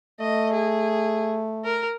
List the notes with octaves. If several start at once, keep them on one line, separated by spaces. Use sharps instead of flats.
A3 D#5
G#4
A#4